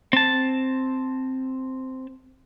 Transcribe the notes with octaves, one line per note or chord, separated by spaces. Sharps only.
C4 A5